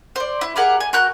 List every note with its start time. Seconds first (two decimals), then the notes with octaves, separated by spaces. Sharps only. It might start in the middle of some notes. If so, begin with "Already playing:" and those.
0.16 C5 D5
0.41 E4
0.56 G4 G#4 A#4 F#5
0.80 G#5
0.93 F#4 A#4 F#6 G6